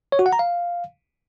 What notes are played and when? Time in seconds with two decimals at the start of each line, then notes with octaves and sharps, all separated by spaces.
0.12 C#5
0.19 F#4
0.26 F#5
0.33 A#5
0.39 F5